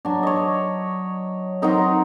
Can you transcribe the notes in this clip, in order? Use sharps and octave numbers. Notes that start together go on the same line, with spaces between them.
F#3 D4
C#5 D#5
F#3 C4 D#4 A#4